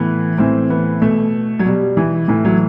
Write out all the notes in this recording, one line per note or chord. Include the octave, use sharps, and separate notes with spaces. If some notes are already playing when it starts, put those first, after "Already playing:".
Already playing: A2 E3 B3
A2 E3 C4
B3
B2 A3
F#3
B2 G3
E3
A2 E3
F#3